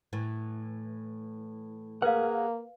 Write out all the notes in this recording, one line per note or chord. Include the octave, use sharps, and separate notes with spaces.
A2 E3
A#3 G#4 A#4 B4 F5 F#5